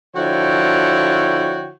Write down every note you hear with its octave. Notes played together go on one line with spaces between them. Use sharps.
D3 F3 E4 F#4 C#5 G5